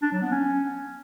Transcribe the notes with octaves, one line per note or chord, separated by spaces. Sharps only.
D4
F#3
B3
C#4